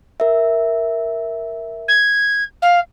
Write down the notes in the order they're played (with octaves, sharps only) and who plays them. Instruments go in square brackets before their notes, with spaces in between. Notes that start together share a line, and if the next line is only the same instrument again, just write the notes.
[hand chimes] A#4 E5
[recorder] G#6
F5